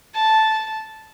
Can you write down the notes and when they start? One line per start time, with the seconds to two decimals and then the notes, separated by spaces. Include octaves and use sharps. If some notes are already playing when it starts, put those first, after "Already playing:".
0.15 A5